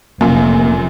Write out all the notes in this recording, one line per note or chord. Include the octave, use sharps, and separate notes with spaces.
F1 F#2 A#2 A#3